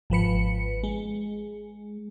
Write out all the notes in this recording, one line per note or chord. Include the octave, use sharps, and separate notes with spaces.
G#1 F3 B4 C#7
G#3